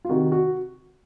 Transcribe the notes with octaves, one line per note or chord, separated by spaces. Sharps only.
F4
C3 D#3 F#4
F#4